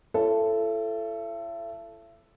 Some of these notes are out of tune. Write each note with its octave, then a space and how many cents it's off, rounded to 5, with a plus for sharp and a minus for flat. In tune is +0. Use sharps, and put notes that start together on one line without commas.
E4 +40 A4 +0 C#5 -10